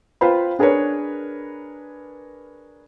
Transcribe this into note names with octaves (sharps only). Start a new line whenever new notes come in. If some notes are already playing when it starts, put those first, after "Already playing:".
F4 B4 C5 F5 G5 B5
D4 G#4 A#4 B4 C#5